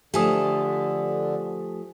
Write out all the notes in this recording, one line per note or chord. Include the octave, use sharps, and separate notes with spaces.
D3 F3 A3 G4 G#5 D#6